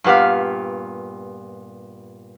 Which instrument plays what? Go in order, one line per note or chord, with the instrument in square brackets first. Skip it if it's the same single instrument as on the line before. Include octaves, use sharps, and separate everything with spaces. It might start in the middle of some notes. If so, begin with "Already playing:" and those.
[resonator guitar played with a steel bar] G2 A#2 B3 G4 F5